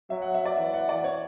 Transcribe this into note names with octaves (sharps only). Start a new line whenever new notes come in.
F#3 E5
F#5
E5
D5
E3 E5
F#5
D5
C#5